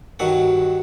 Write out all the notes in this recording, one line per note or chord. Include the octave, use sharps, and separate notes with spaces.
G2 D#3 F#3 F#5